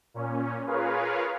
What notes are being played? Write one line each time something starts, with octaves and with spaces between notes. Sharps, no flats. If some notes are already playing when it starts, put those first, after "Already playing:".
A#2 C#4
F4 G#4 A#4 B4 C#5 F5